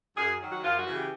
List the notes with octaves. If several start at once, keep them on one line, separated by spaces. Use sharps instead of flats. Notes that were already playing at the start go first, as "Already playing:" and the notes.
F#2 G#4
D#3 F#3
F#4
F#2 F4
F#4
C#3 E3
G4